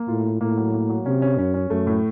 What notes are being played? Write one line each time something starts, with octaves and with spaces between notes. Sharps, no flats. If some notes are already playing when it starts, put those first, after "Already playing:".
Already playing: A#3
A2 F4
F4
A2 A#3
F#3
A#3
F#3
C3 C#4
C#4
F#2 C#4
C#4
F#2 A3
A2